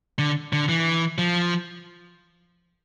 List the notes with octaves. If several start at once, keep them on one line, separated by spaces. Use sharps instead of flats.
D3
D3
E3
F3